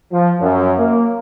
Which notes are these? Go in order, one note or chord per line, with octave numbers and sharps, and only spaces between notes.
F3
F#2
A#3